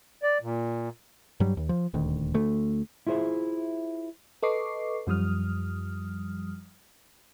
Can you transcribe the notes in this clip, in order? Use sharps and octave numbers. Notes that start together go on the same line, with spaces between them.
D5
A#2
G2 F#3 G3
D#2
F3
D#1 D2 D#3
D2 A3
E4 F4 G#4 C5 E5
A4 B4 D#5 C#6 D6 C7
F#2 F3 G3 D#6 F6